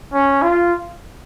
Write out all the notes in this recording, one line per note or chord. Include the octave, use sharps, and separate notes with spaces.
C#4
F4